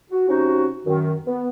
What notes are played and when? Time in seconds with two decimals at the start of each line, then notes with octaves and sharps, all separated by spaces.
0.10 F#4
0.28 C3 C#4 D#4 F#4
0.86 F#2 D#3
1.26 B3